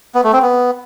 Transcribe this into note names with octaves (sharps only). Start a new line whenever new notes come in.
B3
A3
C4
B3